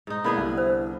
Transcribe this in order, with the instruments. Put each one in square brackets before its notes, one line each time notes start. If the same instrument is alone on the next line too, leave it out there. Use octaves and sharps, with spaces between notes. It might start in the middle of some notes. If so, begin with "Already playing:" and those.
[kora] G#2 D#4
[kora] D3 B3 G#4 [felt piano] A#3 B5 G#6 [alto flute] E4
[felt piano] C2
[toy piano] C5